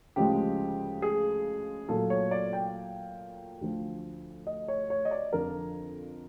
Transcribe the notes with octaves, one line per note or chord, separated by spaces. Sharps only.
D2 C#3 F3 G#3 G4
G#4
A#2 F#3 A3 A4
C#5
D5
G5
D2 D3 F3
D#5
C#5
C#5
D#5
D5
F2 D3 F3 A#4